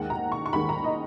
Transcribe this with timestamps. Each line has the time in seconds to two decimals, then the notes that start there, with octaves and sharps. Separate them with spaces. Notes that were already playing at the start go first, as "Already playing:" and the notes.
Already playing: D#2 D#3 G#3 F#5
0.10 A#5
0.32 C#6
0.46 C#6
0.53 D#2 D#3 G#3 B5
0.69 A#5
0.84 D#5